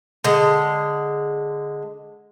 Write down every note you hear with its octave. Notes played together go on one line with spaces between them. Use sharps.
D3 G#3